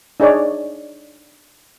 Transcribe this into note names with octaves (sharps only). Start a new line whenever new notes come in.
D4 D#4 G#4 C#5 D5